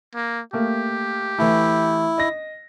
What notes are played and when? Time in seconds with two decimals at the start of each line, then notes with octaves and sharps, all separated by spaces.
0.15 A#3
0.53 A3 A#3 G4
1.38 E3 A3 E4
2.18 D#5 A#6